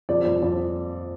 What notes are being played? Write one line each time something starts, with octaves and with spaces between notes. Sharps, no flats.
F2 D5
F2
F2